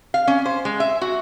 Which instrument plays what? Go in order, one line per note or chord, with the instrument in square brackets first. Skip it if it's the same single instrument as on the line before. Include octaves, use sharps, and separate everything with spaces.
[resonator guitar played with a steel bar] F5
C#4
C5
G#3
E5
F#4